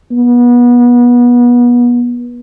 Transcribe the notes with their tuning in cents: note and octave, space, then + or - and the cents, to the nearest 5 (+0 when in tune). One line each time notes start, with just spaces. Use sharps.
B3 -30